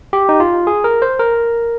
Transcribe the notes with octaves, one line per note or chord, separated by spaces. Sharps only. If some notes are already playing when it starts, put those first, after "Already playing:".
G4
D#4
F4
G#4
A#4
C5
A#4